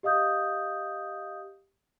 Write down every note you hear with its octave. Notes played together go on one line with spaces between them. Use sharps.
G4 D#5 F5 D#6 G6